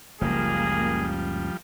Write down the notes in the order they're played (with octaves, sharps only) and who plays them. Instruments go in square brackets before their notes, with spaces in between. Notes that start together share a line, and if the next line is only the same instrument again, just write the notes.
[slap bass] F#1 C#2 [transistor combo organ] F3 G3 [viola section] A#3 [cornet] G#4